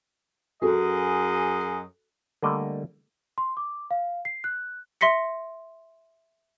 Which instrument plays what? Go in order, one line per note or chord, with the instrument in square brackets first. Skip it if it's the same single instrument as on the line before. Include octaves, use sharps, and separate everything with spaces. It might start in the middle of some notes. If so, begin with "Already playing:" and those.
[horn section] F#2 G#4 D#5 [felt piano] F#4 A4
[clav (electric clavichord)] D3 G3 A3 A#3 D5 D#5
[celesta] C6
D6
F5
C7
F#6
[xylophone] E5 C6 A#6 B6 C#7